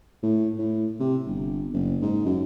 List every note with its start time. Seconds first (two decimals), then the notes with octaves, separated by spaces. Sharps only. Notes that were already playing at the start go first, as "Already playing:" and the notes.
0.23 A2
0.59 A2
1.00 C3
1.27 G1
1.73 F#1
2.02 G#2
2.26 F#2